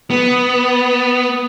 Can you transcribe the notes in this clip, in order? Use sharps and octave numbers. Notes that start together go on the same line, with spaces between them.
B3